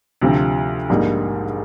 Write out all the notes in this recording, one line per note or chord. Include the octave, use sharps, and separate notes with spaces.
D2 C3 F3
A#1 G#2 G3 A#3 D#4